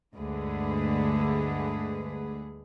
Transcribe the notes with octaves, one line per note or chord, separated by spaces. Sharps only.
D2 G2 D3 G#3 G#4 B4